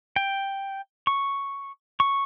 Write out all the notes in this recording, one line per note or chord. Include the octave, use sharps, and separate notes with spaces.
G5
C#6
C#6